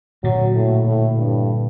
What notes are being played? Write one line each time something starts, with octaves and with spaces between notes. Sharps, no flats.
A#2 D3 F#3
A2
A2
G2